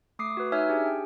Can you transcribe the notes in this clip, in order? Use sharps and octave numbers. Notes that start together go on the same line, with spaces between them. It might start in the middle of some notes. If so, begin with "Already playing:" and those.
A3 D6 D#6 C7
F#4 B4
D#4 C#5 E5 G#5 E6 F6
D4 G4 G#4 G#5
G5